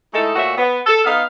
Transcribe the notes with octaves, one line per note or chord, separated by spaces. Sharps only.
G#3 A3 D#4 E4 A4
A#2 A3 F#4 C#5 E5
B3
A4
B3 D#4 F5